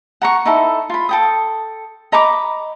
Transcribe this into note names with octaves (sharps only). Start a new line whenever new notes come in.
F#5 A#5 C#6
D#4 E4 A4
F4 B5
A4 G5 D#6
D#5 A#5 B5 D6